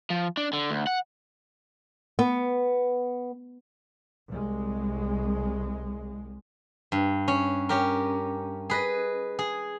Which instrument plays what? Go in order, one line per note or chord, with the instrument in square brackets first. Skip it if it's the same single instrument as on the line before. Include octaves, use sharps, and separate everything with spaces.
[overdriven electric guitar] F3
D4
D3
D2
F#5
[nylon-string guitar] B3
[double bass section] C2 G#3
[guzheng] G2
C#4
C#4 G4 A#4
G#4 B4 D#5
G#4